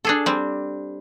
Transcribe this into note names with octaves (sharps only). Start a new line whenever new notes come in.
D4 G#4 A4
G3 C4